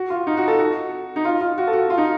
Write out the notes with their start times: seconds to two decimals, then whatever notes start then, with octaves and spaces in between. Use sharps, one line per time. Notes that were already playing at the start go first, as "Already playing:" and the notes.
Already playing: F#4
0.10 F4
0.27 D#4
0.37 F#4
0.48 A4
0.59 F#4
1.16 D#4
1.25 F4
1.41 F4
1.58 F#4
1.67 A4
1.73 F#4
1.90 F4
1.98 D#4